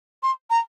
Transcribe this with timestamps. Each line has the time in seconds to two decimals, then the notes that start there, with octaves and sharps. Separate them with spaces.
0.23 C6
0.50 A#5